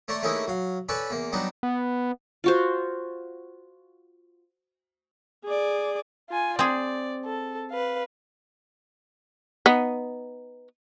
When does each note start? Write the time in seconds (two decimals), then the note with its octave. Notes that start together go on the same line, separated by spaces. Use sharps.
0.08 A3 C#5 D5 A#5 C6
0.23 A3 A#3 C#4 D#4 E4 G#4
0.47 F#3 F5
0.89 C#4 A4 B4 D5
1.11 E2 A#3
1.33 F#3 G3 B3 D4 D#4
1.63 B3
2.44 F4 F#4 C5
5.45 G#4 D5
6.29 F4 G#5
6.59 C4 G#4 D5
7.26 A4
7.70 B4 F5
9.66 B3 D#4